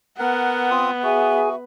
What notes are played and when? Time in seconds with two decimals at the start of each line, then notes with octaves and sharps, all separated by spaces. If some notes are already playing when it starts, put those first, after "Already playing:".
0.19 B3 A#4 F#5
0.70 C4 F4 D#6
1.04 F#4 G#4 E5 G#5